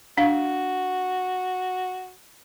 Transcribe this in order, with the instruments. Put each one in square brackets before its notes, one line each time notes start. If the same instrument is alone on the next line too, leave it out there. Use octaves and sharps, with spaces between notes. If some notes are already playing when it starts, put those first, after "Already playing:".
[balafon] D4 F5 [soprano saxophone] F#4